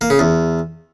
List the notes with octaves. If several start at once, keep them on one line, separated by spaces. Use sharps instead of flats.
A#3
C#3
E2